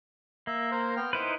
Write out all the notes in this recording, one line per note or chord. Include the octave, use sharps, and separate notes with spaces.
A#3 E5
A#4 C5
B3 G5 F6
D#4 E4 B4 C5